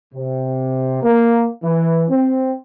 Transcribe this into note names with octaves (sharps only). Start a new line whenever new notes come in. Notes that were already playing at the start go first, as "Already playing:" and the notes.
C3
A#3
E3
C4